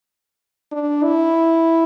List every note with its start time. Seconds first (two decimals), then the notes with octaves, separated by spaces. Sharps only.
0.72 D4
1.04 E4